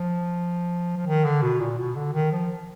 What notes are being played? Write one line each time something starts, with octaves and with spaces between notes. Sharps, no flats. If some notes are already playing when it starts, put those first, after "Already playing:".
Already playing: F3
F3
D#3
D3
B2
A#2
B2
D3
D#3
F3